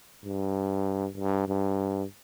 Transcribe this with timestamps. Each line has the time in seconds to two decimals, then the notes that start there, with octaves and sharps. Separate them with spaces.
0.25 G2
1.18 G2
1.48 G2